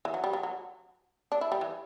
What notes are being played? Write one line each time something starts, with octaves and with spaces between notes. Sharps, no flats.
E3
F#3
G3
F#3
F#3
D4
E4
G3
E3